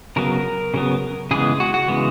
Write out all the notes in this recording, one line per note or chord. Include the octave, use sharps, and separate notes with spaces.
C#3 F#3 B3 A#4
C#3 F#3 B3
C#3 E3 G#3 B3 G#4
F#4
F#4
C#3 E3 G#3 B3